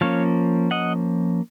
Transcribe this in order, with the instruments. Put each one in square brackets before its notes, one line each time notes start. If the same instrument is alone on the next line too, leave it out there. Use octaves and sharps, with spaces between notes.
[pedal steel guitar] F3 A#3 C#4 C#5 F5
D#5 F#5